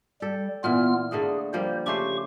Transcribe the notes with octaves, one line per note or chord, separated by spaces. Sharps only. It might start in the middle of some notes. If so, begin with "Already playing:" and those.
G3 G4 A4
A#2 E3 B3 F4 F6
D3 A3 A#3 G#4
F3 G3 A#3 C5
C#3 A3 G4 C5 C#6